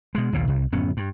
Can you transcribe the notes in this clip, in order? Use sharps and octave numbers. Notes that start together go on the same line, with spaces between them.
B2 G#3
A#1 D#2 A#2
C2
D1 F#2 B3 C#4
G2